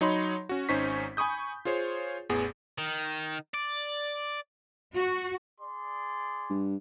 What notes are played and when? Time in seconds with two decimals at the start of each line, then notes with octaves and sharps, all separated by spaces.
0.01 F#3 D#4 C#5 B5 C6
0.49 C#4 F#4
0.69 G#1 C#4 D#4 C5 C#6 B6
1.17 G#5 B5 C#6 D#6 G6
1.65 F4 G#4 C5 C#5
2.30 A1 E2 B3 G#4
2.78 D#3
3.54 D5
4.95 F#4
5.60 G#4 D5 C6
6.50 G2